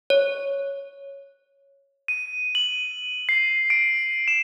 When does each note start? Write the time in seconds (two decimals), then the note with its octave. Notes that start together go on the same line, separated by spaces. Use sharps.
0.10 C#5
2.08 D#7
2.55 F#7
3.29 C7
3.70 D7
4.28 E7